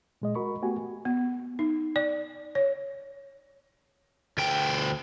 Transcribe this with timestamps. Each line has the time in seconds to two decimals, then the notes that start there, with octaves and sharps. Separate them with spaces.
0.22 A#2 G#3 D#5
0.35 F#4 A#4 B5 C#6
0.62 A3 B3 F#4 G4 G#5
1.05 B3
1.59 D#4
1.96 D5
2.55 C#5
4.38 D2 G5